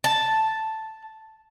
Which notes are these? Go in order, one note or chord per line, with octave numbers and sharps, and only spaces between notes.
A5